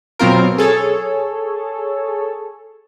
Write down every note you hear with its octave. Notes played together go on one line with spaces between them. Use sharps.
B2 F#3 C4 F4 A#4
G#4 A4 C#5